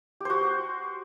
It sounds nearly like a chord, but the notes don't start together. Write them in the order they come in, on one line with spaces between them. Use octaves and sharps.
G4 C5 F#4